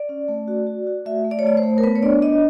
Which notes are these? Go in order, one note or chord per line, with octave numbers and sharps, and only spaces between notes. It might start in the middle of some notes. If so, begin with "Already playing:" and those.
Already playing: D5
C#4
A3
F#4
F#4
F#4
A3 E5
A3
D5
C#5
A3 D5
C5
A3
A#4
B3 B4
C#5
D4 D5
D4 D#5